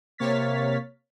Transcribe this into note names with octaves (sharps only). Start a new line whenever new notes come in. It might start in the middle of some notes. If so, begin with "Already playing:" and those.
C3 A#3 C#5 F6 A6 B6